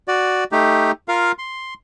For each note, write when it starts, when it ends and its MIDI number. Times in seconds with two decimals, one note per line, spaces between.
0.08 0.44 66
0.08 0.44 74
0.52 0.92 57
0.52 0.92 63
0.52 0.92 67
1.08 1.32 65
1.08 1.32 70
1.08 1.32 77
1.38 1.74 84